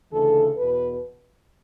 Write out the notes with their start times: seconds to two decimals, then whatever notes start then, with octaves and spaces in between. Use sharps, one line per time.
0.11 D2 C#3 E3 A4
0.57 E2 B2 B4